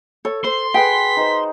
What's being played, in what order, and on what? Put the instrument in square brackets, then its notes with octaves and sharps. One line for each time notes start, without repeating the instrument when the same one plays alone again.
[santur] A4 [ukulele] C#5
[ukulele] C5 [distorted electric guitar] C6
[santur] G#4 B4 F#5 [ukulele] G5 [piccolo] B6
[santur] D#4 C5